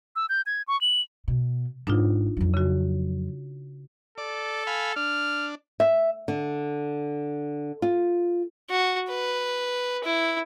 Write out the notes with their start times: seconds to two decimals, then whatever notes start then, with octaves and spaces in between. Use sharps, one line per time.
0.16 E6
0.29 G6
0.46 G#6
0.68 C#6
0.81 F#7
1.28 B2
1.87 G#1 D4 D#4 F4
2.37 F2 F#3
2.54 C#3 F#4
4.18 A4 D5
4.67 F5 G#5 B5
4.96 D4 F6
5.80 E5
6.28 D3
7.82 F4
8.70 F#4
9.09 B4
10.05 E4